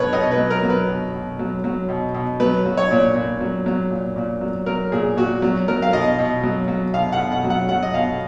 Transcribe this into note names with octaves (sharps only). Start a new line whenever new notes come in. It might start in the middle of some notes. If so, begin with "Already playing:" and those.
Already playing: B2 F#3 A#4 B4 C#5
B2 D#5
B4
F#3
A#4
F#3
B4
B2
B2
F#3
F#3
B2
B2
F#3 B4
F#3
C#5
A#2
A#2
F#3
F#3
A#2
A#2
F#3
F#3 A#4
A#2 G#4
A#2 F#4
F#3
F#3 A#4
F5
B2 D#5
B2
F#3
F#3
B2 F5
F#5
B2
F#5
F#3
F#5
F#3 F#5
D#5
B2 F5